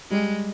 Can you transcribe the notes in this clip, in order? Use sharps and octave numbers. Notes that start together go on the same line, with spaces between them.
G3 G#3 G4